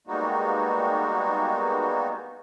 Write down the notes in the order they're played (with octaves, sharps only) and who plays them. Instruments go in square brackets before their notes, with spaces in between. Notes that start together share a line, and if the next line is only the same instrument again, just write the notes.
[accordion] G3 G#3 A#3 B3 D#4 F#4